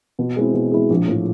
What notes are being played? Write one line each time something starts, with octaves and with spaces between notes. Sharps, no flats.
B2
G#3 C4 E4
B2
G#3 C4 E4
A#1
A2 F3